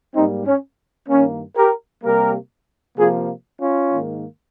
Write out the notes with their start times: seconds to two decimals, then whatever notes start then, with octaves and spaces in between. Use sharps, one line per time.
0.15 G#2 G3 A#3 C4 D#4
0.46 C#4
1.09 G2 D#3 A#3 C#4
1.56 G4 A#4
2.03 C3 G3 A#3 G4 A#4
2.97 C3 F3 A#3 F4 G#4
3.60 C#4 F4
3.92 G#2 D#3 A#3